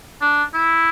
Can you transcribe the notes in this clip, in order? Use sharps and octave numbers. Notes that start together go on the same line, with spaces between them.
D4
E4